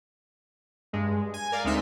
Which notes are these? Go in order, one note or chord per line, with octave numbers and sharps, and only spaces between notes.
G2 G#3
G#5
A#4 D5 F5
D2 G#3 C4 D#4 E5 C6